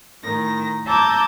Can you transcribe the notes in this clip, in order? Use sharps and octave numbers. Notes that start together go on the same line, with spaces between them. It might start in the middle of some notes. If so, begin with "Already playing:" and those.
A2 D#3 A#6
A5 A#5 D6 E6 G6 G#6